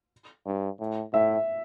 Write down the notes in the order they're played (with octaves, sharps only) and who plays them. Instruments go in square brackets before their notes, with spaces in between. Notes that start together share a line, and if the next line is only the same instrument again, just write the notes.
[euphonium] G2
A2
[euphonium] A2 [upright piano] E5